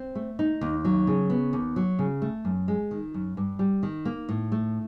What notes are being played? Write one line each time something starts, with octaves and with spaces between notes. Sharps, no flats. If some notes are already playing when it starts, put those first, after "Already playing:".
Already playing: C4
A3
D#4
D#2
F#3
C#3
B3
D#2
F#3
C#3
A3
F#2
G#3
D#3
F#2
G2
G3
D#3
A#3
A2
A3